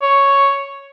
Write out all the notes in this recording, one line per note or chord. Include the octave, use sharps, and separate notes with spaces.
C#5